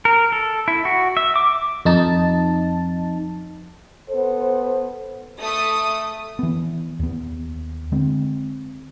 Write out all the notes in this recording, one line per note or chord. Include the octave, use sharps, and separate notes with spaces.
A#4
A4
E4
F#4
E5
D6
F2 D#4 A5
B3 A4 C5
A3 D#6
E3 B3
D#2 B3
D3 G#3 C4